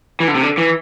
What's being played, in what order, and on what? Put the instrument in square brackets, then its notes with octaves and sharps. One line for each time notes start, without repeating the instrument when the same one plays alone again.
[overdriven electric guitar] E3
D3
C3
D3
E3